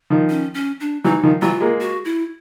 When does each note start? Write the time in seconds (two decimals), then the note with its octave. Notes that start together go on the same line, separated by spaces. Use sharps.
0.10 D#3 F3
0.30 C#4
0.54 C#4
0.80 D4
1.04 E3 F#3 D#4
1.23 D#3 F3
1.42 E3 F#3 F4
1.61 G#3 A#3
1.81 F#4
2.05 E4